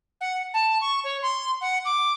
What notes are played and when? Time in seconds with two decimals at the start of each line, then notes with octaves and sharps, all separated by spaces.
0.21 F#5
0.54 A5
0.81 C#6
1.04 C#5
1.22 C6
1.61 F#5
1.85 D6